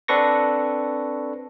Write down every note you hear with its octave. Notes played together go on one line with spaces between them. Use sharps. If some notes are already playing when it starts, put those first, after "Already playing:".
C4 D4 A4 B4 C#6 A#6